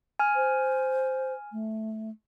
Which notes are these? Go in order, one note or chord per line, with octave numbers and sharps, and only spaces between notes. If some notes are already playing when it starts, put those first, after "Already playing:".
G#5 F6
C5
A3